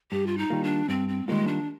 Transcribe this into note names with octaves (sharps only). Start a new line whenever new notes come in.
G2 G4
F4
D#4
D#3 G3 A#3 F4
D4
G2 C4
C4
D#3 G3 G#3 A#3 F4
D4